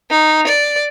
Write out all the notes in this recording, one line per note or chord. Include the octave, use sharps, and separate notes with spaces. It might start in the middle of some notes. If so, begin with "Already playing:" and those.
D#4
D5